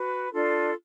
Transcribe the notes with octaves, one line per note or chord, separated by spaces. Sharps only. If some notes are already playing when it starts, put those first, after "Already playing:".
Already playing: F#4 B4
D4 F4 A4